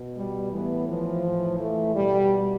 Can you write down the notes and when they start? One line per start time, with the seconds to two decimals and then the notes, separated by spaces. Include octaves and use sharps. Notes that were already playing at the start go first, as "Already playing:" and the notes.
Already playing: B2
0.17 G3
0.52 A2 E3 B3
0.88 F3
1.24 A2 E3
1.59 A3
1.95 B2 G3